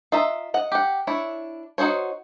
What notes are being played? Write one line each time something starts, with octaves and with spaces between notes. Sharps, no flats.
F4 D#5 E5 A#5
D#5 F#5
G4 F#5
D4 E4 C#5
D#4 F#4 G#4 C5 C#5